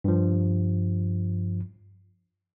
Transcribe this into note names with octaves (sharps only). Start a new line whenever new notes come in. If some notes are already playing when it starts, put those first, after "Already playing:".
G2 F3